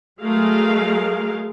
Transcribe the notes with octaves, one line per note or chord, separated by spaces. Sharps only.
F#3 G#3 A3 G#4 A#4 F5